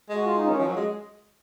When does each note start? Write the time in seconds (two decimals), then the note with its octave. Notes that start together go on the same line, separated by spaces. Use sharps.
0.09 G#3
0.15 F#4
0.26 F4
0.37 D#4
0.47 D#3 C#4
0.60 F3
0.68 F#3
0.76 G#3